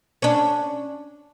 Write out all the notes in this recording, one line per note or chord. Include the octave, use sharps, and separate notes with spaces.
C#4 D4